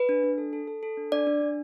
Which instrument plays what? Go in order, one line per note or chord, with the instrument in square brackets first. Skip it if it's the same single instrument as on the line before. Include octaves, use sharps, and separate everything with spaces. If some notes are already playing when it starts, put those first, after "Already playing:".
Already playing: [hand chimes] B4
D4
D4
A4
A4
A4
A4
D4
D4 D5
D4
D4